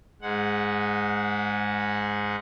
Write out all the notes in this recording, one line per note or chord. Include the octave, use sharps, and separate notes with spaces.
G#2 G#3 F#5